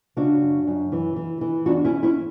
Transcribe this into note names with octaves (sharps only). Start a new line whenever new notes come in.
C#3 D4 F#4
F#2
F#2
E3
E3
E3
E2 D4 F#4
C#4 E4
E2
C#4 E4